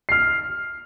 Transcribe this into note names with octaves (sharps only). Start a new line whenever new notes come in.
F6 C7